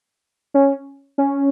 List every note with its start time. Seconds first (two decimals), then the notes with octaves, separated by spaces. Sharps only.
0.54 C#4
1.18 C#4